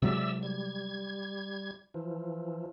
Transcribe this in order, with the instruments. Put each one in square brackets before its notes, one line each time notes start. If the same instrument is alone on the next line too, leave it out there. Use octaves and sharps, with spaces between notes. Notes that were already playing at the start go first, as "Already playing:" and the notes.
[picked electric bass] C3 F#3 G#3 [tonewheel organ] D5 E5 E6
[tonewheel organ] G3 G#6
E3 F3